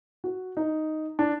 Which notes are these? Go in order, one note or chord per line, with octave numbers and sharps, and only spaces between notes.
F#4
D#4
D4